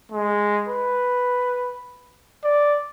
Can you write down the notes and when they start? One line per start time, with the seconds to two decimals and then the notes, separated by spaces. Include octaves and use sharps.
0.11 G#3
0.68 B4
2.44 D5